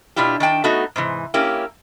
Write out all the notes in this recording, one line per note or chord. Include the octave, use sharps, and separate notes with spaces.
B2 D4 E4 F4 G4
D#3 D4 G5 A5
A3 B3 D#4 F#4
G#2 C3 E3
A#3 C#4 E4 G4